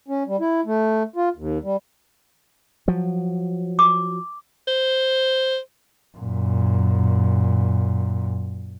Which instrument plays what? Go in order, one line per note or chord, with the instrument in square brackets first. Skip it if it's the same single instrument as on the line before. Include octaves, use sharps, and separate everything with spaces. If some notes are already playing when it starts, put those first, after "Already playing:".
[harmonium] C#4
G3
E4
A3
F4
D#2
G3
[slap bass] F3 F#3
[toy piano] D6
[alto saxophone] C5
[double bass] F#2 A#2